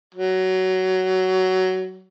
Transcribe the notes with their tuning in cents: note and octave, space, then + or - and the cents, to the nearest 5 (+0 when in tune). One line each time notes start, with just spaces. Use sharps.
F#3 +15